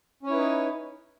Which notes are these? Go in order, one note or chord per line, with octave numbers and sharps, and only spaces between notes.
C#4 D#4 E4 B4 C#5